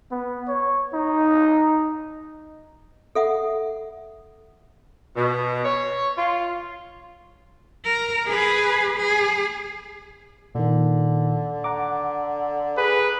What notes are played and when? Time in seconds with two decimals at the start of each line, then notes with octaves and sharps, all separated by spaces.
0.11 B3
0.48 C#5
0.94 D#4
3.15 A4 E5 F#5
5.17 B2
5.65 C#5
6.17 F4
7.85 A#4
8.26 G#4 B4
8.98 G#4
10.55 A#2 D3 D#3
11.64 F#5 A#5 D6
12.78 G#4 B4